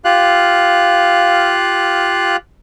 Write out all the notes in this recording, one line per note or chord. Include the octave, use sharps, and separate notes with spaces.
F4 G4 F5 F#6